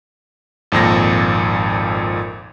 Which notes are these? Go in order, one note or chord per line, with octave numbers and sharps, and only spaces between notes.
G#1 F2 A#2 A#6